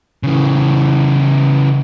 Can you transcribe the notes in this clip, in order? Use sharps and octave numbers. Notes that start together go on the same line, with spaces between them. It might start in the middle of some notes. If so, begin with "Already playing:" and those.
C#3 E3